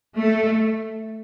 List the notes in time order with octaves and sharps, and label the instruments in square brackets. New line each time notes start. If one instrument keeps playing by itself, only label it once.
[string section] A3